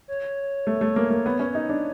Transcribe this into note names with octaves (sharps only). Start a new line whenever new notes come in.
C#5
A3
A3
A#3
A#3
B3
C#4
D#4
D4